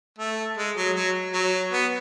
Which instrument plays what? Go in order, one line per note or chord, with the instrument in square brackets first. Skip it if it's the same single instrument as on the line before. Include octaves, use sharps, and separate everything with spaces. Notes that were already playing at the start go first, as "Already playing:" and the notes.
[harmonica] A3
G#3
F#3
F#3
F#3
B3